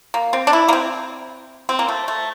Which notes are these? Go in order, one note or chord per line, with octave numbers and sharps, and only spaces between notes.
A#3
C4
D4
E4
A#3
C4
C4
A#3
A3
A3